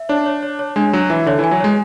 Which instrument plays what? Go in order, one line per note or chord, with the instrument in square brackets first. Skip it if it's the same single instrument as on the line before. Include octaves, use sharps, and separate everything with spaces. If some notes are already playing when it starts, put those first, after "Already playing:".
Already playing: [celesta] E5
[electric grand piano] D4 [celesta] C#5
[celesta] C#5
C#5
C#5
[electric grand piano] G#3 [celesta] D4
[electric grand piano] F#3 [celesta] D4
[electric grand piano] E3 [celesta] E5
[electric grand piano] D3 [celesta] C#5
[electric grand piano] E3
[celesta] G#5
[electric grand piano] F#3
[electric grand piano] G#3 [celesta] C#5